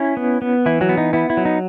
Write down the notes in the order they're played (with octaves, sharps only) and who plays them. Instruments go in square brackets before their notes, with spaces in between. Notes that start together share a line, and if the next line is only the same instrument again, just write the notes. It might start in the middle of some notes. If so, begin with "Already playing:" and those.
Already playing: [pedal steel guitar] C#4 E4
B3
B3
E3 E4
F#3 F#4
B3
D#4
B3 E4
E4
F#3
D#4